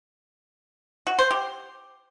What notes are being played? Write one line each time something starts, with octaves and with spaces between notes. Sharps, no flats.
F#4
C5
G4